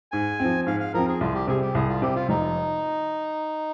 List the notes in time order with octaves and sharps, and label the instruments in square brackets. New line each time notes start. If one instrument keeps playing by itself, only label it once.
[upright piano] G#2 [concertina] G#5
[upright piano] F3 C4
[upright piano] G#2 [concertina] F5
[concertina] F5
[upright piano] F3 C4 [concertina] A#4
[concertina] G#4
[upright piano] C2 [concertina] F4
[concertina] G4
[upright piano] C3 G3 [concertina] G#4
[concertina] G4
[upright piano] C2 [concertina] G#4
[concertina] F4
[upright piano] C3 G3 [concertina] G4
[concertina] F4
[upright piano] F1 [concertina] D#4